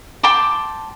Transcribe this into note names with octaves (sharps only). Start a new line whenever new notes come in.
G5 A5 C6 D6